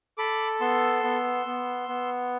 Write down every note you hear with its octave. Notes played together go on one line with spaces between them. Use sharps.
A4 B5 D6
B3 C6 E6
B3
B3
B3